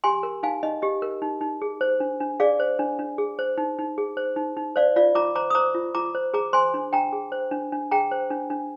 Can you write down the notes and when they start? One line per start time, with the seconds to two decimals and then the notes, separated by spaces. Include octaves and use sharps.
0.04 G4 G#5 C6
0.23 A#4
0.43 D#4 F5 G#5
0.63 D#4 D#5
0.82 G4 D#5
1.02 A#4
1.22 D#4
1.41 D#4
1.62 G#4
1.81 C5
2.00 D4
2.20 D4
2.40 G#4 D5 F5
2.60 C5
2.79 D4
2.99 D4
3.18 G#4
3.39 C5
3.58 D#4
3.78 D#4
3.98 G#4
4.17 C5
4.36 D#4
4.57 D#4
4.76 C5 D5 F5
4.96 F4 D5 F5
5.15 F4 A#5 D6
5.35 C5 A#5 D6
5.50 D#6
5.55 C5 A#5 D6
5.74 F4
5.95 F4 A#5 D6
6.15 C5
6.34 G#4 A#5 D6
6.53 C5 G#5 C6
6.74 D4
6.93 D4 G5 A#5
7.13 G#4
7.32 C5
7.51 D4
7.72 D4
7.91 G#4 G5 A#5
8.11 C5
8.30 D4
8.50 D4